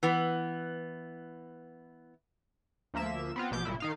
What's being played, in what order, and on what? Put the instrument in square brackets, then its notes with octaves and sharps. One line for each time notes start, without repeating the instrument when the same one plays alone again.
[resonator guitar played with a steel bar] E3 B3
[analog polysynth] D2 F3 A#3 E5 E7
B3 C4 F4
A#1 B2 D6 G6
G1 A#2 E4
D#3 D#4 F5